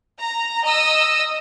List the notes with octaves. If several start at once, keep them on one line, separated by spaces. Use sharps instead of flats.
A#5
D#5 E6